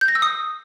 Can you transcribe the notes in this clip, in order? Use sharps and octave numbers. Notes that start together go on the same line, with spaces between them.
G6
A#6
E6
D#6